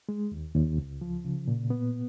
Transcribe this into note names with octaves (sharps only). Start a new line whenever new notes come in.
G#3
D#2
D#2
C#2
F3
C#3
A#2
B3